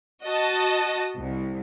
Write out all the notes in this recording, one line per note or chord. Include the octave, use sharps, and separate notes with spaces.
F#4 D#5 A5
C2